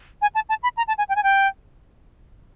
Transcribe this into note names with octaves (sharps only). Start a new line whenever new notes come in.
G#5
A5
A5
B5
A#5
A5
G#5
G5
G#5
G5